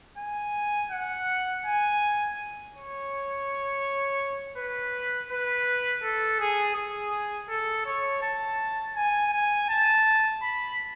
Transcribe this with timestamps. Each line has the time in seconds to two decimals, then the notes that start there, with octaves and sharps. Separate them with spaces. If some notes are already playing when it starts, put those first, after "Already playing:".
0.18 G#5
0.90 F#5
1.65 G#5
2.73 C#5
4.57 B4
5.30 B4
6.03 A4
6.39 G#4
6.76 G#4
7.49 A4
7.86 C#5
8.22 A5
8.96 G#5
9.33 G#5
9.69 A5
10.42 B5